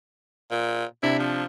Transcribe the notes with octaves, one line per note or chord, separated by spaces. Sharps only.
A#2
C3 D4 E4
F3